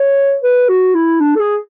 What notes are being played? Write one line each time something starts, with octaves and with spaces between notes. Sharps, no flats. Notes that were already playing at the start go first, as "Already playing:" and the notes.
Already playing: C#5
B4
F#4
E4
D4
A4
G#4